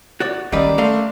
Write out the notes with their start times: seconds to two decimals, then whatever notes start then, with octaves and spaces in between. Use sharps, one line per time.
0.20 F#4 C#5 D5
0.52 D#3 G3 A#3 C#4 D4 B4
0.78 A3 D5 F5 C6